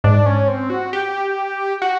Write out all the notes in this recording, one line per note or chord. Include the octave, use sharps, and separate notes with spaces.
G#2 D4
C#4
C4
F#4
G4
F#4